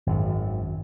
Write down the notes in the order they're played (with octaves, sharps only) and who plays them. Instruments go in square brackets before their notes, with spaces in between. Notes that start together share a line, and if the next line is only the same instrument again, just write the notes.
[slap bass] G#1 F#2